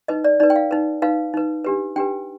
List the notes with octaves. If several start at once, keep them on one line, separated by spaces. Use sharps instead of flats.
D#4 B4 D#5
D5
D#4 B4 D5
G5
F5
D#4 B4
D#4 B4 F5
D#4 B4
D4 G4 B4
D4 G4 B4 G5